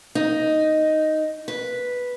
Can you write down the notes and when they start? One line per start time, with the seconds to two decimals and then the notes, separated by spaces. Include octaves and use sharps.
0.15 D#4
1.48 B4